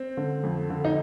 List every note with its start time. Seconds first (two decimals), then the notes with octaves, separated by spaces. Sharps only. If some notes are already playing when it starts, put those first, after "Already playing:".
Already playing: C4
0.17 D3
0.43 F2
0.70 D3
0.85 D#4